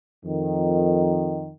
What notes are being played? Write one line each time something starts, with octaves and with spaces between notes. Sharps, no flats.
F2 D#3